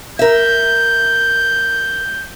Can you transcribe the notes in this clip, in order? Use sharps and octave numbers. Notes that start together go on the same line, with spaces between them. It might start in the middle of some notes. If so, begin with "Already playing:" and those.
A#4 E5 G6